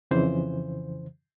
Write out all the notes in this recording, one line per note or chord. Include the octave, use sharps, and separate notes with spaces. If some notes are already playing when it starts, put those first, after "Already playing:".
F2 C#3 E3 C5